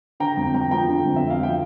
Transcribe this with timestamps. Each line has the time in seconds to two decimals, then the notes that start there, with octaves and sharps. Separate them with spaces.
0.20 D3 G5 A#5
0.37 F2
0.54 F2 G5 A#5
0.71 F3 G5 A#5
0.88 D3
1.05 F2
1.16 E5
1.22 F2
1.30 F5
1.39 F3 G5